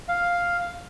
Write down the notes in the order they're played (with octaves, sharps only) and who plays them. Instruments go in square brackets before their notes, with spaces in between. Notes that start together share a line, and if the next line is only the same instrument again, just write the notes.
[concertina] F5